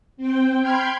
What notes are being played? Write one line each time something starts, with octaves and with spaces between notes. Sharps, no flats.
C4 G5
G5 B5 C6 F6 G6 G#6